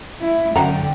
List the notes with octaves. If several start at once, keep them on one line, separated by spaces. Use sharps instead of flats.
E4
F#2 D3 C5 F#5 G5 A#5